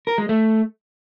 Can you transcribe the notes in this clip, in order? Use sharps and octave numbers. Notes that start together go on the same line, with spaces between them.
A#4
G#3
A3